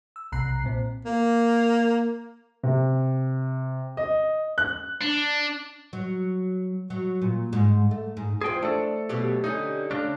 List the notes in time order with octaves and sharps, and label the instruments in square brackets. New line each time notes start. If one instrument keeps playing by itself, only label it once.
[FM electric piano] E6
B1 C3 A#5 F#6 C7
A#2 C4
[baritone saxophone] A#3
[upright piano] C3
D#5
F#6
[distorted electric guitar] D4
[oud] F#3
F#3
A#2
G#2
A3
G#2
[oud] E2 F3 [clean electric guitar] G#4 G5
[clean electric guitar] A3 A4 [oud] D4
[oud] B2 F#3 G4
[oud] D3 G3 C#4 [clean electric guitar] D#4
[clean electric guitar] C#3 C#4 D4 [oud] A3